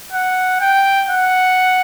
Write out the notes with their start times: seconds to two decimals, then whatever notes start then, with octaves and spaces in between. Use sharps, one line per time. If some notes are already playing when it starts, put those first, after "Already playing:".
0.12 F#5
0.61 G5
1.10 F#5